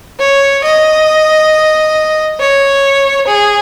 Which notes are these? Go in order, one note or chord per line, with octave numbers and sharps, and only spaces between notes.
C#5
D#5
C#5
G#4